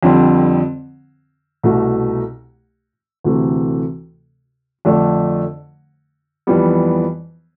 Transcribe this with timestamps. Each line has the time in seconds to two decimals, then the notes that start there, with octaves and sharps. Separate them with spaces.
0.03 F2 D3 G3 C4
1.63 C2 B2 A3
3.24 D2 C3 E3 A3
4.85 F2 D3 A3 D4
6.47 F2 E3 G3 B3